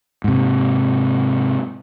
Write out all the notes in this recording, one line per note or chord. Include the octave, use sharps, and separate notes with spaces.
G#2 C3